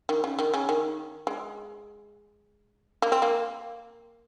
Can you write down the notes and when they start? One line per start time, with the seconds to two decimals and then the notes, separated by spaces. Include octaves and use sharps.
0.09 D#3
0.24 C#3
0.39 D#3
0.54 C#3
0.69 D#3
1.27 G#3
3.02 A#3
3.12 C4
3.22 A#3